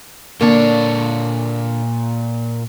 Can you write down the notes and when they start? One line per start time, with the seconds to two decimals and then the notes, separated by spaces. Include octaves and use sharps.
0.41 A#2 D3 A#3 D4 C#5